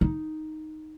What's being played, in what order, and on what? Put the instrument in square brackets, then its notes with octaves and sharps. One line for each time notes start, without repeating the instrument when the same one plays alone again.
[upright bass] D#4